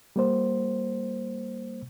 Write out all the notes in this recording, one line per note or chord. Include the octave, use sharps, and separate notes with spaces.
G3 A#3 C5